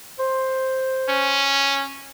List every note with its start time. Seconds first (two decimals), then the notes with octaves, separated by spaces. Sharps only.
0.19 C5
1.08 C#4